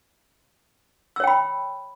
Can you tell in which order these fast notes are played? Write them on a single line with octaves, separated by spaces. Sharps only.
E6 C#5 G5 B5